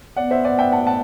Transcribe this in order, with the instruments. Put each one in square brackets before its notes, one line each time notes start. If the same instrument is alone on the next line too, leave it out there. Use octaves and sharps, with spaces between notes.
[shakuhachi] B3 [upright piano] D5 F#5
[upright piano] C5 E5
D5 F#5
E5 G5
F#5 A5
F#5 A5